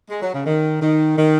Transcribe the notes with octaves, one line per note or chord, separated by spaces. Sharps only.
G#3
F#3
C#3
D#3
D#3
D#3